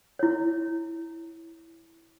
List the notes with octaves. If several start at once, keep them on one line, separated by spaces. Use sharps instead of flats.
E4 C#5